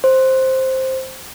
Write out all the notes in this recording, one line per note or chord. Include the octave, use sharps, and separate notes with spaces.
C5